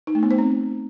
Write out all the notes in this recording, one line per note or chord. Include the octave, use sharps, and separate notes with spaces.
D#4
A3
B3
C5
C4